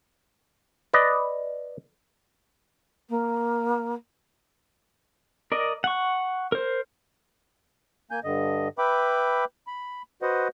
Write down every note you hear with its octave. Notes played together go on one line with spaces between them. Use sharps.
B4 D5 D#5
A#3
A#4 D5 D#5
F#5 C#6
A#4 C5
A#3 G#5 G6
G2 D3 D#5
B4 E5 G5 B5 D6
B5
F#4 B4 C5 D#5 F#5